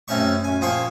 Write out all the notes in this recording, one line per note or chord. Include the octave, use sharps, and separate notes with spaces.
F#2 C3 A3 C#4 D#4 C#6
F#2 G#5
A#2 F3 G#4 G5 C6 C#6